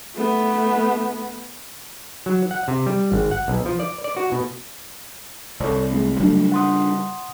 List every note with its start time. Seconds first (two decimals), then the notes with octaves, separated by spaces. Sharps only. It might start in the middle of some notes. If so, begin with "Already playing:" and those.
0.14 A3 B3
2.26 F#3
2.51 F#5
2.68 C3
2.86 G3
3.12 G#1
3.31 F#5
3.48 B1
3.66 F3
3.80 D5
4.04 D5
4.16 F#4
4.32 B2
5.60 C2 A4 C#5 D5
5.91 G#3 A3 C4
6.20 C#3 F#3 G3 A3 D4
6.52 F#5 C6 D#6